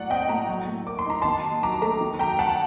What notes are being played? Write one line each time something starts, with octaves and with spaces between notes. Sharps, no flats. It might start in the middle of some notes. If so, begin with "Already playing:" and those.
Already playing: A2 F#3 D5 F#5
C4 D#5 G5
A2 G5 A#5
F#3
A2
A#3 D6
C6
D#4 A#5
D#3 A5 C6
D#2
F#3 A#5 D6
A3 A#5 D6
D#3
F#2 G5 A#5
F#3 F#5 A5